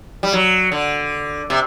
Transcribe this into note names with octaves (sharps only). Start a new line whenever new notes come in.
G3
F#3
D3
C3